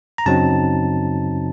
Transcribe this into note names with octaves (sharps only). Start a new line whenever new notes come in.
A#5
F#2 C#3 F#3 C4 D#4 A5